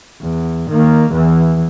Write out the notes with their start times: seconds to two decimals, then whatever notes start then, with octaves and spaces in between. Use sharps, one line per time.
0.22 E2
0.70 D#3 A#3
1.11 E2 E3